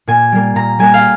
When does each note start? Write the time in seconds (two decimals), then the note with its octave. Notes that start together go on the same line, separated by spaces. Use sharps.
0.07 A#2 G#5
0.32 G3 A#3
0.55 A#2 A#5
0.79 G3 A#3 G#5
0.94 F5